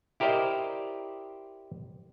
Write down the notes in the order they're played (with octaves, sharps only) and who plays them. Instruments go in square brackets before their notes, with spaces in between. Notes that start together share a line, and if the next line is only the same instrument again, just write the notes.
[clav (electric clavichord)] E4 G4 A#4 C5 D5 D#5